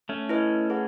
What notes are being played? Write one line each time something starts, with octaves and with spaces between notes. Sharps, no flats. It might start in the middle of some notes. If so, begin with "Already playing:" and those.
A3 C#4
E4 B4 D#5
G#4 B4 F#5